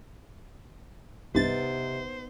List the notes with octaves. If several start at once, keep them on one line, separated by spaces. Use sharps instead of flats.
C2 G2 C3 B3 D#4 C5 A6